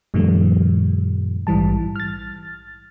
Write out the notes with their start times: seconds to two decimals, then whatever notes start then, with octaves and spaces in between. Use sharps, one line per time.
0.14 F#2 A#2 D#3 F3 G3 A3
1.47 A#1 G#2 E3 G3 A5
1.96 F6 A6